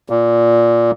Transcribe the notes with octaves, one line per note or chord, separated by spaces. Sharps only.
A#2